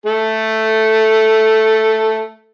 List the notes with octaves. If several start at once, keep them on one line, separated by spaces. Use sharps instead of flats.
A3 A4